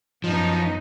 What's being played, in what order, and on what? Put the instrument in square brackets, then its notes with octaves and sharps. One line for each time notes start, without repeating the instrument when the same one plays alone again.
[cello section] F#2 B3 D#4 [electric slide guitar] F3